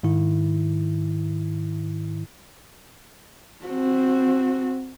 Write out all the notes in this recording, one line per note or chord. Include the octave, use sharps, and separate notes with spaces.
G#2 D#3 E4
C4 F#4